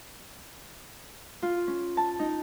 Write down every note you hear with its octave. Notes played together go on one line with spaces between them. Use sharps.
F4
C#4
A5
D#4